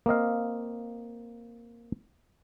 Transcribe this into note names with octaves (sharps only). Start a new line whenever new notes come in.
A#3 C4 D#5 F5